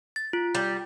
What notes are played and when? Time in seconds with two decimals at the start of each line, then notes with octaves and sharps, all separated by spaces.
0.16 A6
0.33 F4
0.55 G3